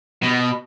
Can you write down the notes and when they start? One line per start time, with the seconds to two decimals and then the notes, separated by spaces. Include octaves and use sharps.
0.23 B2